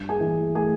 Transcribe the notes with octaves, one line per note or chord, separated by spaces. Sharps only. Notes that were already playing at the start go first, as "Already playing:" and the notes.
Already playing: G2
G#4 G#5
E3
A3 G#4 G#5